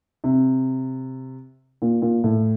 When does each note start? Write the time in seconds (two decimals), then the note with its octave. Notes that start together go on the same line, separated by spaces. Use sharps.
0.24 C3
1.82 A#2
2.02 A#2
2.24 A2